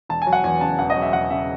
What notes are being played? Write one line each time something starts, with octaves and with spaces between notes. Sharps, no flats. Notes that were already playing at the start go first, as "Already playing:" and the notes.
E1 A5
G#5
F#3
F#5
E2 G#5
C#3 A5
E1 F#5
D#5
F#3
E5
E2 F#5
C#3 E5